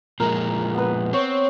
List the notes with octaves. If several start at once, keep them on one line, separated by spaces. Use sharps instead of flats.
A#2 F3 G#3 A#4
B3 B4
C4 C#5